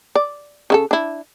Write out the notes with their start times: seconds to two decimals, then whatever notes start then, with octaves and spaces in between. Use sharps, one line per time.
0.15 D5
0.70 C#3 E4 A4
0.91 D4 E4